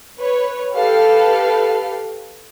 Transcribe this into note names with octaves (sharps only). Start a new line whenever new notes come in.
B4 C#5
G4 A4 B4 F5